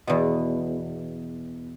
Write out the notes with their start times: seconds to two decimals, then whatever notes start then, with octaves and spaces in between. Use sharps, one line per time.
0.07 E2 B2